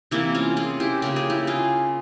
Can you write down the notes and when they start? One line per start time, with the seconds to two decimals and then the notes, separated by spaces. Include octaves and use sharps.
0.11 C3 E3 A#3 E4
0.34 C#4 F4
0.57 F4 G#4
0.80 E4 G4
1.02 C#3 F3 A#3 G4
1.16 G#4
1.30 E4 G4
1.47 F4 G#4